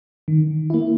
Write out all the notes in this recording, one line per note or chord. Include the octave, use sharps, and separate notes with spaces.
D#3
A#3 E4